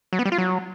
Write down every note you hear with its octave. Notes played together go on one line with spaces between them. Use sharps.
F#3
B3
G3
F4
F#3